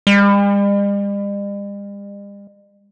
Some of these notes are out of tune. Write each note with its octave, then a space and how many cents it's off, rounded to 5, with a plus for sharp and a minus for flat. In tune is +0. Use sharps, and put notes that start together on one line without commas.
G3 +45